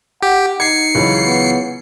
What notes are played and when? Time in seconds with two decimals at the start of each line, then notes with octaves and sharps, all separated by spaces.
0.23 G4 F#5
0.60 D#4 G#6 C7 C#7
0.95 C#2 E3 F#3
1.25 B3